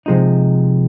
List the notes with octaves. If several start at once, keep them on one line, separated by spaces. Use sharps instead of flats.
C3 F3 G#3 D#4